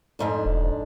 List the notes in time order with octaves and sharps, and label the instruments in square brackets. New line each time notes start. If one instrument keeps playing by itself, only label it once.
[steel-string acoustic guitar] F2 G#2 D4
[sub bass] E1